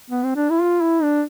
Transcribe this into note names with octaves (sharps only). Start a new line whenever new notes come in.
B3
C4
D4
E4
F4
E4
D4